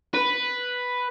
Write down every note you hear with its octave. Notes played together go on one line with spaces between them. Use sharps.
B4